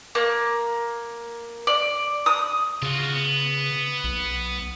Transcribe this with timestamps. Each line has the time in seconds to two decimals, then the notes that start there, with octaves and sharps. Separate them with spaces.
0.15 A#3
1.67 D5
2.26 D#6
2.82 C#3 F4 F#4
3.15 B3
4.04 B1